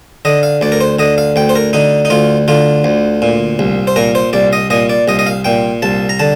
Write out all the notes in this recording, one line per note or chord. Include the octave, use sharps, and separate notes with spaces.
D3 D#5
F5
D2 D5
A#4
C5
D3 D#5
F5
D2 G5
C5
A#4
D3 D#4
D#4
D2 F4
D3 F4
D2
A#2
C2
C5
A#2 A#4
C5
C2 D5
D#5
A#2 D#5
D5
C2 D#5
D#5
F5
A#2 G5
C2 A5
A#5
D3 A5